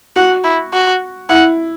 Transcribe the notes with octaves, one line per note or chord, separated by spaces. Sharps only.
F#4 F#5
E4
F#4
E4 F#5